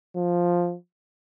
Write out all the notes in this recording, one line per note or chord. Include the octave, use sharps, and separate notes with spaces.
F3